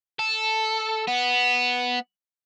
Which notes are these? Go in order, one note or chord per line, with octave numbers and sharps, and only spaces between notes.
A4
B3